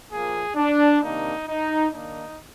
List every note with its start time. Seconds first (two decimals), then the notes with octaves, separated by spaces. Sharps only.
0.11 A#2 F3 A#3 G#4
0.56 D4
1.01 C3 D#3 A#3 D4 D#4
1.47 D#4
1.92 D#3 A#3 D4 D#4